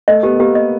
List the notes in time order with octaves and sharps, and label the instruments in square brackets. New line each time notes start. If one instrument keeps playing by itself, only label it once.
[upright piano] A3 [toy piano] D#5
[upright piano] B3 [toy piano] G4
[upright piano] A#3 [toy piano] G4
[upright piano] A#3 [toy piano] D#5